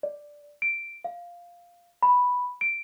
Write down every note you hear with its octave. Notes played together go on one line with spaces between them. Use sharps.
D5
D7
F5
B5
D7